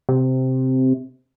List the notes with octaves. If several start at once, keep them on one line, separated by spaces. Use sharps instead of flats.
C3